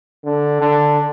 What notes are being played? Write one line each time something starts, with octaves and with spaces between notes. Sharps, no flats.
D3
D3